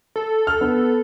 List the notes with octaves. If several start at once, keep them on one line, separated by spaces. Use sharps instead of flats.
A4
F6
B3